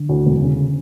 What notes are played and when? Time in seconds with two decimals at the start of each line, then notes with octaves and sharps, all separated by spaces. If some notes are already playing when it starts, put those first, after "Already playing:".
Already playing: D3
0.09 D2
0.26 E1
0.41 C#3